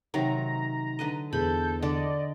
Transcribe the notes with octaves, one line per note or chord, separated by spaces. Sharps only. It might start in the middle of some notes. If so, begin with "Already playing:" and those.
C3 D#3 F#3 A#5
D3 B4 D#5
E2 A4 B5 G6
D3 A4 D5 D#5